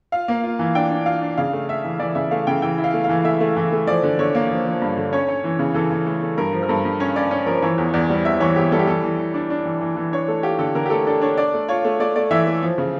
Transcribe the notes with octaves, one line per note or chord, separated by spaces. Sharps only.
F4 F5
A#3
F4
E3
D4 G5
D4
F4 F5
D4
C#3 F5
A3
A3 E5
E3
E3 D5
C#3 E5
A3 F5
C#3 G5
E3 G5
E4
F5
A3
F5
E3
A3 E5
A3
E3
A3
F3 D5
D3
D3 C#5
A#3
F3
F3
G2
D3
C#4 C#5
C#4
E3
C#3
E3 A4
E3
A3
A3
G2 A#4
F3
A#4
G2 A4
G2
C#4 C#5
C#4 D5
C#4
F3 A#4
E3 C#5
E2
E2 D5
G3
E2 E5
E3 C#5
E2 G4
G3 A4
G4
E3 A4
E3
E3
D4
D4
E3
E3
E3
D4 C#5
A3 A4
F4 G4
D3 A4
D3 A#4
G4
A3 A4
D4 A4
D4 C#5
D4 D5
A3
F4 C#5
A3
A3 D5
A3 D5
E3 E5
A3
F3
C#3